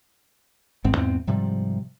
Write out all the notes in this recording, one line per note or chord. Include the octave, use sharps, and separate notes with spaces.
A1 G#2 B3 C4
E2 G#2 B3 C4
G#2 C3 F3 G3